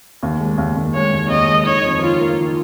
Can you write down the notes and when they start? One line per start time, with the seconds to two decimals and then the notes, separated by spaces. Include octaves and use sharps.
0.23 D#2
0.40 G#3
0.58 D#2
0.76 D#2
0.95 G#3 C#5
1.13 D#2
1.30 D#2 D#5
1.48 G#3
1.67 D#3 C#5
1.84 F2
2.03 D#3 F4
2.21 A#3
2.39 D#3